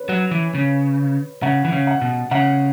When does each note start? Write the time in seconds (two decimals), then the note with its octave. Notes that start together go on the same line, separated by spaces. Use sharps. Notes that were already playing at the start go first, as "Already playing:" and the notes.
Already playing: B4 C#5
0.09 F#3
0.31 E3
0.55 C#3
1.42 C#3 F#5
1.65 E3
1.72 C#3
1.87 F#5
2.01 B2
2.31 C#3 F#5